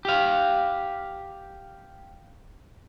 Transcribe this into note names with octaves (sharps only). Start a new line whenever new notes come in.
G4 F5